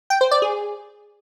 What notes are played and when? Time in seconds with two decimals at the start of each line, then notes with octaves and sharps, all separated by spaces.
0.10 G5
0.21 C5
0.31 D5
0.42 G#4